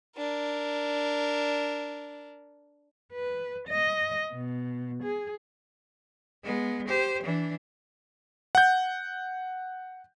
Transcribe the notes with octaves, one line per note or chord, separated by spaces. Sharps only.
D4 A#4
B4
D#5
B2
G#4
G#3 B3
G4 C5
E3 D4
F#5 G6